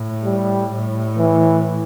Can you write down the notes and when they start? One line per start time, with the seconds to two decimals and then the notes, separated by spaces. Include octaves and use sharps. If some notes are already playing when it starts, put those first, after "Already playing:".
Already playing: A2
0.25 G3
0.71 A2
1.18 E3